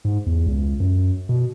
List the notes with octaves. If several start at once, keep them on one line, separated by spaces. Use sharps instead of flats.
G#2
E2
C#2
F#2
B2